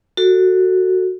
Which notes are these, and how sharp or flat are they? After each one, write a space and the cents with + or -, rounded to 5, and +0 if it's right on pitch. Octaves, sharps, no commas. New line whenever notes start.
F#4 +0 A4 +25